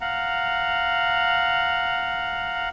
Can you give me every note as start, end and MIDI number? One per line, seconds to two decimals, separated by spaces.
0.01 2.69 77
0.01 2.69 78
0.01 2.69 82